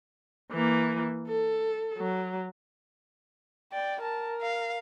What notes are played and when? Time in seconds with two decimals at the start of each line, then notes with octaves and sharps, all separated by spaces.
0.52 E3 A#3
1.28 A4
1.98 F#3
3.72 D5 G5
4.03 A#4 A5
4.42 F5